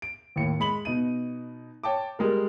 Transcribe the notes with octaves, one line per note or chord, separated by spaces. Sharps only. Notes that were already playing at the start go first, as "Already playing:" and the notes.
D7
D#2 A2 C#7
G#3 B5 F#7
B2 D#4 D#7
C#5 G5 A5 D6
G3 G#3 A#4